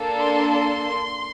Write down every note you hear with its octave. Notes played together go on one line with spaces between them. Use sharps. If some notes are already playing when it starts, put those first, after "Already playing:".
Already playing: A#3 D4 A4
C6
C6